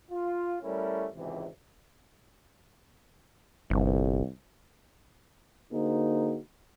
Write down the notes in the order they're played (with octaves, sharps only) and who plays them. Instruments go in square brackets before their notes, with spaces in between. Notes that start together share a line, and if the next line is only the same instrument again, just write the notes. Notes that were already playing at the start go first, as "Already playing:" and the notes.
[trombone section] F4
G3 A3 C#4 E4 A#4
G#1 C#2 C3 E3
[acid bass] G1 [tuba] C2
[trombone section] D3 A#3 D#4 F#4 G#4 C5